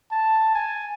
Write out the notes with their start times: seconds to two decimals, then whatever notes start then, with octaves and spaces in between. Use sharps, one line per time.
0.12 A5
0.55 G#5